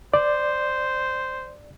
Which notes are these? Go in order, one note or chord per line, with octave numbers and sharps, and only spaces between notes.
C5 D5